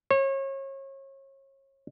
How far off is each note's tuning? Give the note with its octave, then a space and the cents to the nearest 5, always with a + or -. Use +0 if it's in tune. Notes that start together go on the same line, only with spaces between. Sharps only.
C#5 -35